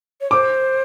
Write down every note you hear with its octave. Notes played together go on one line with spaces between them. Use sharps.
C#5
C5 D6